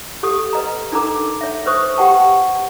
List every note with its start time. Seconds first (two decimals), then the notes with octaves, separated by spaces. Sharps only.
0.23 G4 A4 D#6
0.53 B4 D#5 A#5
0.92 D4 D#4 A4 A#4 A#5 D6
1.41 C#5 E5
1.66 B4 C5 C#6 D#6
1.97 G4 B4 F#5 G5 A5 C#6